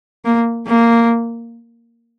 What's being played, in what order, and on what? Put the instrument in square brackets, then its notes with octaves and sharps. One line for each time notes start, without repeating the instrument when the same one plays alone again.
[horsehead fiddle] A#3
A#3